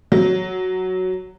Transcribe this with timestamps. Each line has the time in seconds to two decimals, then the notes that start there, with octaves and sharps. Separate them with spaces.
0.12 F#3